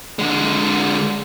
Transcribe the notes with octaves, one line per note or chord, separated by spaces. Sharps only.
D3 G#3